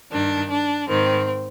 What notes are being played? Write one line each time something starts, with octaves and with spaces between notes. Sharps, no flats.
G2 D#3 D4
D4
G#2 D#3 C4